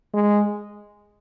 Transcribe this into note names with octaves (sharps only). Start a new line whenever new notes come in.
G#3